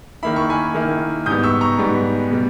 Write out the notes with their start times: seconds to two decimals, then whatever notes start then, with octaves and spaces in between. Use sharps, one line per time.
0.23 D#3 A#3 E4 B5
0.36 C#6
0.50 G#5 B5
0.75 D#3 A#3 E4
1.26 G#2 G3 B3 D#6 G6
1.43 C#6 E6
1.61 A#5 C#6
1.78 G#2 G3 B3
2.31 B2 G3